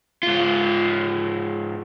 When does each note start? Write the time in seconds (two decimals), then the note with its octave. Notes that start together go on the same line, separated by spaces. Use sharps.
0.23 G#2 F4